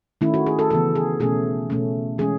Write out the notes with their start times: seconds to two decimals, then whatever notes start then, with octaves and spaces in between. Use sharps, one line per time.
0.21 D#3 A3 C#4 E4
0.34 F#4
0.46 G#4
0.59 A4
0.70 C#3 E3 B3 A4
0.95 G#4
1.20 B2 A3 C#4 G#4
1.70 B2 A3 C#4
2.18 E3 G#3 C#4 G#4